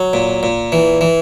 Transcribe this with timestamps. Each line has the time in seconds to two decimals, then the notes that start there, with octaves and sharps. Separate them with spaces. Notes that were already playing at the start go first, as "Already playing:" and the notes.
Already playing: F#3
0.13 A#2
0.43 A#2
0.72 E3
1.01 E3